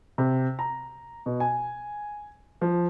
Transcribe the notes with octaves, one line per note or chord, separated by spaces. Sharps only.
C3
A#5
B2
G#5
F3